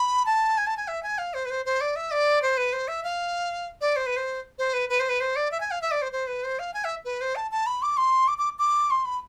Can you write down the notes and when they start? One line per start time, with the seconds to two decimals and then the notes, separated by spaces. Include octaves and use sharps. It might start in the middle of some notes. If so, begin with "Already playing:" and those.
Already playing: B5
0.26 A5
0.58 G#5
0.67 A5
0.77 G#5
0.88 E5
1.03 G#5
1.18 F5
1.34 C5
1.45 B4
1.50 C5
1.66 C5
1.81 D5
1.96 E5
2.11 D5
2.42 C5
2.57 B4
2.73 C5
2.88 E5
3.04 F5
3.81 D5
3.96 C5
4.06 B4
4.16 C5
4.59 C5
4.73 B4
4.89 B4
5.00 C5
5.09 B4
5.20 C5
5.36 D5
5.51 E5
5.60 G#5
5.71 F5
5.82 E5
5.91 D5
6.02 C5
6.12 C5
6.27 B4
6.44 C5
6.59 F5
6.74 G#5
6.84 E5
7.05 B4
7.21 C5
7.36 A5
7.51 A5
7.66 B5
7.82 D6
7.97 C6
8.28 D6
8.38 D6
8.59 D6
8.91 C6
9.05 B5